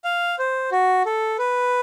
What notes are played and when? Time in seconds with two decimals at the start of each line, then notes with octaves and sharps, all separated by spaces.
0.04 F5
0.39 C5
0.71 F#4
1.06 A4
1.38 B4